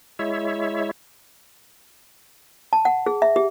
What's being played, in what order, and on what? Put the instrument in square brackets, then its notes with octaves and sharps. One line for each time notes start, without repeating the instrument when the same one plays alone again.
[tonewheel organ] G#3 E4 C#5 E5
[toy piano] A5
F#5
G#4
E5
G4